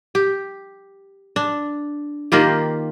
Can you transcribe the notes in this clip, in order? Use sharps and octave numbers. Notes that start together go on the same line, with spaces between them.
G4
D4
D#3 A#3 F4 G4